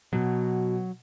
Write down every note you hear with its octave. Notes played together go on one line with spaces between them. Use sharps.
B2 F#3